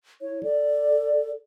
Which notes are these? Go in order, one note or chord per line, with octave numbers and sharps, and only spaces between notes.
E4 C#5
A4 D5